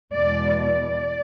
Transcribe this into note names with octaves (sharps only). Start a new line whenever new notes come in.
E2 B2 G#3 D5
D5